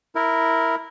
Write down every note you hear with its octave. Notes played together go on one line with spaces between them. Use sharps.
E4 A#4